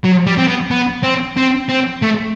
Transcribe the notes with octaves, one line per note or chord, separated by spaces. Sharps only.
F#3
G3
C4
B3
B3
C4
C4
C4
A3